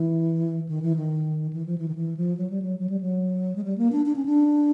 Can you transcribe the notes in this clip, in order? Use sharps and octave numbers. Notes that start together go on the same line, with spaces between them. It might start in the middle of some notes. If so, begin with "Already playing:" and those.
Already playing: E3
D#3
E3
D#3
E3
F3
E3
D#3
E3
F3
F#3
G3
F#3
F#3
G3
F#3
G#3
G3
A#3
D4
D4
C#4
D4